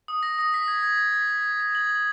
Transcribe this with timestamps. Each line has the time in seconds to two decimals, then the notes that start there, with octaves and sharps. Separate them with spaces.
0.08 D#6
0.23 A#6
0.39 D#6
0.54 B6
0.68 G#6
0.83 G#6
0.99 B6
1.14 B6
1.30 G#6
1.45 G#6
1.60 G#6
1.75 F#7
1.90 G#6